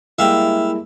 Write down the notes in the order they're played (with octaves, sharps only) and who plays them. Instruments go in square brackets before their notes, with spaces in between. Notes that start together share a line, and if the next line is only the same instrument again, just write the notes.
[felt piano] G3 G#3 A#3 [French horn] E4 [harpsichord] E5 F5 G5